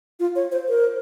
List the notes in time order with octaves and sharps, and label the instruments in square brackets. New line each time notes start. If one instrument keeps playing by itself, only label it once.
[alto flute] F4
C#5
C5
A#4